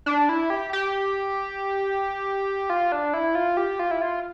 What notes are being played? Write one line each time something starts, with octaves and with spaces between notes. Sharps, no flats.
D4
E4
G4
G4
F4
D4
E4
F4
G4
F4
E4
F4